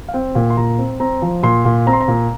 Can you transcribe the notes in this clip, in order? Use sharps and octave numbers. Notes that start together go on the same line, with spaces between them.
F5
C4 G5
A#2
C6
A#2 A#5
C4
C4 A#5
F3
A#2 C6
A#2
C4 A#5
C6
A#5
A#2